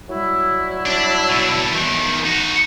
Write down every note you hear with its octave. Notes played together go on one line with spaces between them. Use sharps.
F#3 G3 E4
D4
B2 D4
E2 D#3
D#4 F#4